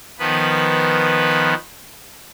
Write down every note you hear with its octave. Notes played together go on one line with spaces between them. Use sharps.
D#3 F3 B3 B4